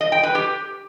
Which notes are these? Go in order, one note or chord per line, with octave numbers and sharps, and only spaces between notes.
D#5
G5
B4
G4